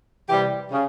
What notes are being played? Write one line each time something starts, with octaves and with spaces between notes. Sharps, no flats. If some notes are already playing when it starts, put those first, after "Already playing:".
C3 E3 G3 G4
C#3